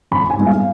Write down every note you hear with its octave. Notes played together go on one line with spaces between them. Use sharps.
G#1 B5
G#5
G#2 G3 B3
F5